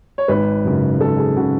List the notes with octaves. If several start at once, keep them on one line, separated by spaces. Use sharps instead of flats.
C#5
G#1 B4
F#2 C#3
G#1 A4
G#4
C#3 F#4